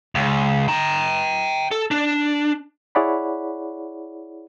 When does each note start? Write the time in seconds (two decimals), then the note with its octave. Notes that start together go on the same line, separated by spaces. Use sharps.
0.15 C#2
0.68 G5 A#5
1.71 A4
1.91 D4
2.95 E4 G#4 C#5 D5 F#5 B5